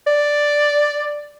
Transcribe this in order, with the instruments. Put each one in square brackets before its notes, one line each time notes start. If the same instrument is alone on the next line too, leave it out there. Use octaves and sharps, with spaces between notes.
[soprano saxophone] D5